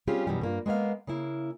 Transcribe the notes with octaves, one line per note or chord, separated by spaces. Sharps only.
G3 C4 C#4 F4 G4 G#4
F#2 B2 E3 G3
G2 A#3 F4
G#3 A#3 B3 D5 F5
C#3 A#3 E4